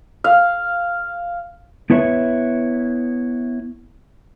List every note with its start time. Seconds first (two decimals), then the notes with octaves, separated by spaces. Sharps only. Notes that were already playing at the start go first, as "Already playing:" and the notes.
0.24 F5
1.90 B3 E4 B4 C#5 E5